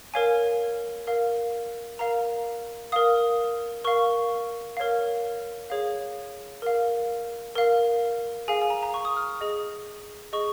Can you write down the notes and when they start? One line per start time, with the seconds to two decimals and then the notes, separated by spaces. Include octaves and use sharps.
0.14 A#4 C#5 F5 G#5
1.07 A#4 F5
1.99 A#4 F5 A#5
2.92 A#4 F5 D#6
3.84 A#4 F5 C#6
4.77 A#4 C#5 F5
5.70 G#4 C#5 F5
6.62 A#4 F5
7.56 A#4 F5
8.48 G#4 F5 G#5
8.62 G#5
8.70 A#5
8.83 A#5
8.94 C#6
9.05 D#6
9.17 F6
9.41 G#4 D#5
10.33 G#4 D#5 C#6